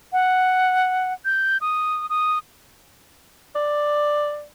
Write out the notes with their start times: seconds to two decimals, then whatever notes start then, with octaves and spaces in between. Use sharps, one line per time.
0.12 F#5
1.25 G6
1.61 D#6
2.10 D#6
3.56 D5